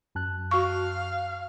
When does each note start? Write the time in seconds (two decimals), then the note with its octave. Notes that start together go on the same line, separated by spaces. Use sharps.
0.15 F#2 A5 F#6
0.51 F#4 F5 C#6